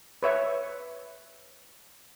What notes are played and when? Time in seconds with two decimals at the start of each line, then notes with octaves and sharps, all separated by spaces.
0.23 B4 C#5 E5 C#6